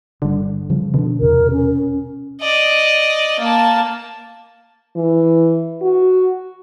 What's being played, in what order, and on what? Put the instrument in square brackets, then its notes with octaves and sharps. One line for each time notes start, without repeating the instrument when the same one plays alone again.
[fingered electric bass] G1 G3 [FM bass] D3
[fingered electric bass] C#3 F3 G3
[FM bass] B2 [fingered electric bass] D3 D4
[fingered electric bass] A1 E2 C3 [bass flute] A#4
[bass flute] C#4
[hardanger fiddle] D5 D#5
A#3 A5
[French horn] E3
F#4